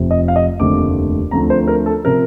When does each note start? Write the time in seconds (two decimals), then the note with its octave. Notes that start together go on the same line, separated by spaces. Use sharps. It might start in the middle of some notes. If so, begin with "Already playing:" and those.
Already playing: F1 F2 C3
0.11 D#5
0.28 F5
0.36 D#5
0.60 F1 D#2 D3 A3 C4 D6
1.31 D2 D3 F3 A3 C4 A#5
1.50 C5
1.68 A#4
1.86 A4
2.05 C3 F3 C4 A#4